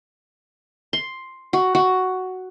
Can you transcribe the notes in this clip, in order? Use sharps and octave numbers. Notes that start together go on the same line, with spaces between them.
C6
F#4
F#4